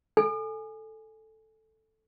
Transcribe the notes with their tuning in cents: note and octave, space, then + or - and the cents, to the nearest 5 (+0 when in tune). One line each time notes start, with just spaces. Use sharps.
A4 +0 G#5 +0